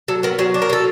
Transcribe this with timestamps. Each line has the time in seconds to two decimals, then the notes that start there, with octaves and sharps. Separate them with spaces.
0.08 F#3 A4
0.23 B3 A#4
0.39 F#3 G#4
0.54 D4
0.62 A#4
0.70 F#3 A4